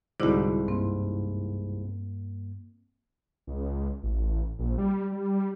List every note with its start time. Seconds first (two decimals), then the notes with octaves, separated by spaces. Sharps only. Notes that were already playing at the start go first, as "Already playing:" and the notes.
0.20 C2 G#2 D3 E4 F#4 D5 D6
0.68 G2 A#3 C4
3.47 C#2
4.03 A1
4.59 A#1
4.78 G3
5.12 G3